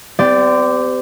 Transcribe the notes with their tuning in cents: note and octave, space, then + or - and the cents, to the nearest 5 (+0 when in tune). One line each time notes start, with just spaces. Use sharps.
C4 -45 G4 +0 D5 +0